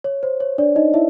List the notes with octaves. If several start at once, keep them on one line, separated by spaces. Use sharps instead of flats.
C#5
C5
C#5
D4 D5
D#4 D#5
E4 E5